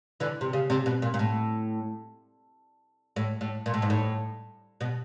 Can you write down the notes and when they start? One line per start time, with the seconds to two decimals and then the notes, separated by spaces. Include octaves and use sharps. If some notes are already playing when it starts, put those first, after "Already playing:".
0.20 D3 E3
0.41 C3
0.53 C#3
0.70 C3
0.86 B2
1.02 A#2
1.14 A#2
1.19 A2
3.16 A2
3.41 A2
3.66 A#2
3.74 A2
3.82 G#2
3.90 A2
4.81 B2